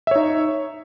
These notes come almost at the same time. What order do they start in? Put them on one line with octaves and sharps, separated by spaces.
E5 C#5 D#4